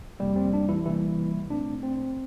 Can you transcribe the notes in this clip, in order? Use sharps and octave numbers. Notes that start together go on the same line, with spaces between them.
F2 C3 G3 A#3 G4
C4
D4
E3 E4
C3 E3 G3 A#3 E4
A#2 A3 C4 D4
C4